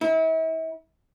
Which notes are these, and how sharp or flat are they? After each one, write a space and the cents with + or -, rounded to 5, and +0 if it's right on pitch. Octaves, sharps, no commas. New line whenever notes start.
E4 -40